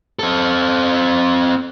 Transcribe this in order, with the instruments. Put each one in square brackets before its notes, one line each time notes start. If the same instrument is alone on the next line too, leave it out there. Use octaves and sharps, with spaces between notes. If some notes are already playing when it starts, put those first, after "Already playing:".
[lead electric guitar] C4 A4